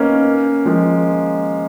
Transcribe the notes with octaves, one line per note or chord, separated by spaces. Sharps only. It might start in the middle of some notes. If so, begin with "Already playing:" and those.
Already playing: A#3 B3 C#4 D#4
F3 G#3